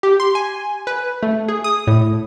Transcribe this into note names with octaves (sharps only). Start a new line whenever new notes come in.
G4
C6
G#5
B4
A3
G#4
D#6
A2